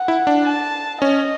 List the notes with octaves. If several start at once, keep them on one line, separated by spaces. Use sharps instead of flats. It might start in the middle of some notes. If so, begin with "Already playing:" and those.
Already playing: F#5
E4
D4
A5
C#4 D#5